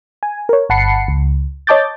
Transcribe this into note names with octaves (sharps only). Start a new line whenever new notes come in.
G#5
A#4 C#5
G1 F#5 A5 B5 C7 C#7
C#2
C#5 D#5 A5 D6 G6 A6